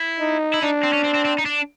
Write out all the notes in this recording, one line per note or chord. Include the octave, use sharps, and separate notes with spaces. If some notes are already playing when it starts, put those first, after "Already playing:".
Already playing: E4
D#4
E4
D4 D#4
C4
C#4
C4
C4
C4
D#4
D4